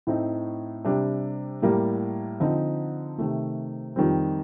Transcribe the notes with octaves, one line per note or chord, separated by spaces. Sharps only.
A2 A3 C4 D#4
C3 G3 D4
A2 G3 A#3
D3 F3 C4 D#4
C3 D#3 A3
F2 D#3 G3 C4